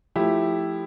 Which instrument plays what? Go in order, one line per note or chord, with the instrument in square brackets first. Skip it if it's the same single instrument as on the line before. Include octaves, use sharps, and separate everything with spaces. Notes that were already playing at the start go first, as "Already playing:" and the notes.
[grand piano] F3 A3 E4 G4